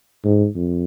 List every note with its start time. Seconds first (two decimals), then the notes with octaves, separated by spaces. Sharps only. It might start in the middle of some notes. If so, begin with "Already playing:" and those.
0.24 G#2
0.56 F2